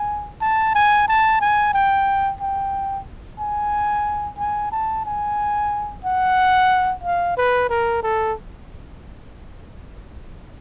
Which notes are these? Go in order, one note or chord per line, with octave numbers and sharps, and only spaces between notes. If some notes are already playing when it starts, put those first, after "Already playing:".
Already playing: G#5
A5
G#5
A5
G#5
G5
G5
G#5
G#5
A5
G#5
F#5
F5
B4
A#4
A4